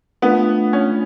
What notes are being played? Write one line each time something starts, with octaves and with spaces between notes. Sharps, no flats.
A3 B3 D4 F4
C#4